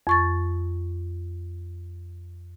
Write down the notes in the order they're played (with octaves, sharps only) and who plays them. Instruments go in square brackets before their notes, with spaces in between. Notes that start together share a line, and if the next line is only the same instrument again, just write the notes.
[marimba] F2 C#6 A6